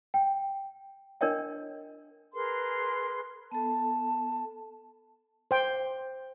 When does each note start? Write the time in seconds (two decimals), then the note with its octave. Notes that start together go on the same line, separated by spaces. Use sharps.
0.14 G5
1.21 D4 A#4 C#5 D#5 G5
2.34 G#4 A#4 B4 C6
3.52 B3 A4 A5
5.51 C5 G5